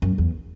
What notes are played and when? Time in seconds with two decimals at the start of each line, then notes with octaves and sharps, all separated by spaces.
0.02 F#2
0.18 E2